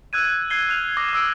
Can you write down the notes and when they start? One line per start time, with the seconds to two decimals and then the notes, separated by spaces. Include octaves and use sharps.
0.13 E6 F#6 G#6 D#7
0.50 F#6 G#6 C7 G7
0.69 F6 F#6 F7
0.97 D6 D#6 G#6 A#6
1.13 D6 E6 D7